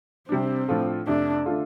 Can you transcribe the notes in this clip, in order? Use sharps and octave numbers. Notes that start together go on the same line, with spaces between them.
C3 G3 C4 D4
A2 F3 D4 F4 A4
F2 C3 A3 D4
D3 A3 D4 F4 A4